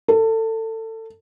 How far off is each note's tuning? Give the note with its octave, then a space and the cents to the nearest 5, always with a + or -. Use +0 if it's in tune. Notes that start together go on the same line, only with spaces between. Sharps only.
A4 +25